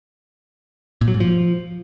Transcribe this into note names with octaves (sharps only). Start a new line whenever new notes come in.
A#2
F#3
G#2
F3